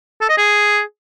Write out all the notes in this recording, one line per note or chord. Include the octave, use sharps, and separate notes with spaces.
A4
D#5
G#4